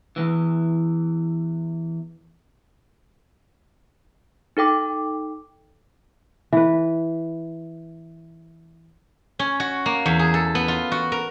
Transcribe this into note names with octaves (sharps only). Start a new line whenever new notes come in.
E2 G#2 E3
D#4 A4 G5 D6
E3 B4
C#4
F#4
A#3
E2
G#4
A4
B3
F4
F#4
A#4